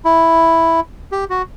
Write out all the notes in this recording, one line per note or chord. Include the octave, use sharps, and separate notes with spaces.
E4
G4
F#4